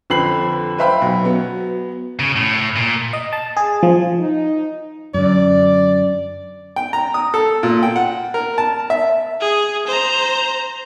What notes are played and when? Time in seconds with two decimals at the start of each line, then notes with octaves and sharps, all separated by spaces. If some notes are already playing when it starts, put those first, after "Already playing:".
0.10 F2 D3 B4 B5 C7 F#7
0.78 B4 C5 E5 F5 G5 B5
1.02 B1
1.25 F#3 B3
2.19 C#3
2.36 A2
2.76 A#2
3.13 D#5
3.33 A5
3.57 G#4
3.83 F3
4.20 D#4
5.14 F#2 D3 D5
6.76 G5
6.93 A#5
7.14 D#6
7.34 A4
7.63 A#2
7.83 G5
7.96 F#5
8.34 A#4
8.58 A5
8.90 E5
9.40 G#4
9.87 C5 A#5